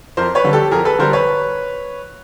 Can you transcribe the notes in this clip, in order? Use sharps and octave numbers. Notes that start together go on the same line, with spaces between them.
F2 A#4 C5
B4 C#5
D3 G3
G4 A4
F2 G#4 A#4
A4 B4
D3 G3 A#4 C5
B4 C#5